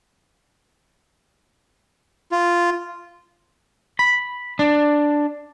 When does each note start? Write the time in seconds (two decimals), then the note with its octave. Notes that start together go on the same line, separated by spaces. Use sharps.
2.32 F4
3.99 B5
4.59 D4